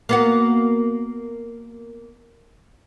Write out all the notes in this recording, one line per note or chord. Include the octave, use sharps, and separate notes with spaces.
A#3 B3 F#4